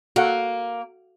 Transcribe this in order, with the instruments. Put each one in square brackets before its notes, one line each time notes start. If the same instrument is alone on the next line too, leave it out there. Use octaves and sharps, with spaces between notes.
[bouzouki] A#3 [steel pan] F#4 A4 F#5